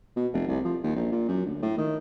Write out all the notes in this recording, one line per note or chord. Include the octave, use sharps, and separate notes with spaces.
B2
F1
C2
F3
D#2
A#1
A#2
F#2
D2
A2
D#3